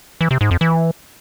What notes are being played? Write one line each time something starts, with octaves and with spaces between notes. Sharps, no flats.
E3
C3
G#2
F2
E3